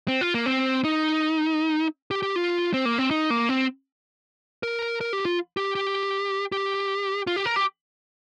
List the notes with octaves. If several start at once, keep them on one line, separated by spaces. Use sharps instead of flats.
C4
F4
A#3
C4
D#4
G4
G4
F4
C4
A#3
C4
D#4
A#3
C4
A#4
A#4
G4
F4
G4
G4
G4
F4
G4
A#4
G4